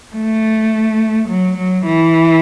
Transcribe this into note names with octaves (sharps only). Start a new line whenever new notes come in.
A3
F#3
F#3
E3